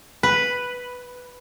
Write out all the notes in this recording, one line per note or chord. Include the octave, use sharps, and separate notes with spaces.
B4